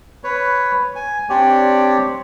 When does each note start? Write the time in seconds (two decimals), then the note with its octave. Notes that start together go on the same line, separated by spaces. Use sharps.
0.24 B4 C#5
0.95 G#5
1.30 C4 D4 G4 C#5 D5